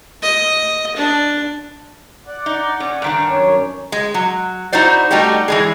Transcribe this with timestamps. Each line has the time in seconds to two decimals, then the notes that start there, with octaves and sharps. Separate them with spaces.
0.22 D#5
0.96 D4
2.27 D5 F#5
2.46 D#4
2.80 C#4
3.02 G2 D#3 D4
3.30 F#2 C#4 C#5
3.92 G#3
4.14 F#3
4.72 D#4 E4 F#4 C5 D5
5.11 G3 A3 D#4 F#4 G4
5.48 E3 G#3 G#4